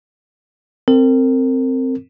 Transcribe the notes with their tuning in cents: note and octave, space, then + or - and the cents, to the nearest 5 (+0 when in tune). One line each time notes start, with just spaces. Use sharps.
C4 +0 A#4 -35